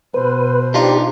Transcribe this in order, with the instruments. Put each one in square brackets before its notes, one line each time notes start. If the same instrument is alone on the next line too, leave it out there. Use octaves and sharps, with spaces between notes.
[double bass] B2 [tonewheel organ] B4 [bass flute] C5
[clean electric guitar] D4 D#4 F4 [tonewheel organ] G4